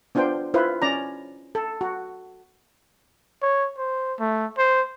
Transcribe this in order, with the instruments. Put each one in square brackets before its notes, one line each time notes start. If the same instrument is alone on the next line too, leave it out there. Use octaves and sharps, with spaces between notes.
[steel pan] B3 D4 F4 C5 G5
E4 F4 B4 C5
C#4 D5 A#5
A4
F#4
[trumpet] C#5
C5
A3
C5